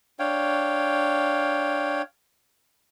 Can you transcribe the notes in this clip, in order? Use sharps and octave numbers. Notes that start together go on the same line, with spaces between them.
D4 C#5 F5 G5